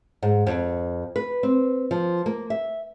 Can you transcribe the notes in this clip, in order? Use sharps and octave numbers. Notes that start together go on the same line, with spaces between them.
G#2
F2
B4
C4
F3
A#3
E5